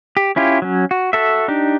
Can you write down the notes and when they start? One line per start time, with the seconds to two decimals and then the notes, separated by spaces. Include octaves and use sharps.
0.17 G4
0.36 C#4 E4 F4 G4
0.62 F#3 C#4
0.91 F#4
1.13 F#4 A4 E5
1.48 D4 D#4 G4